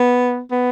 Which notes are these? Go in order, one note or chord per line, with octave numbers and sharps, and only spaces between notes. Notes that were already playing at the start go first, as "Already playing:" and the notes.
Already playing: B3
B3